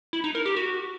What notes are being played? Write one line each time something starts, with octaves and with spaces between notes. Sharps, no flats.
E4
D#4
A#4
G4
F#4